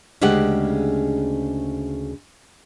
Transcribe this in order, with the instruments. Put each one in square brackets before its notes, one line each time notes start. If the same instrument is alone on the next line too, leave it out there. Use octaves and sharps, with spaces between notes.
[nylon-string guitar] D2 C#3 G#3 G4 F#5